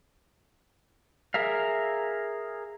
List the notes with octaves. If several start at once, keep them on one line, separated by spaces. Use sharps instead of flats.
G#4 A#4 E5 F5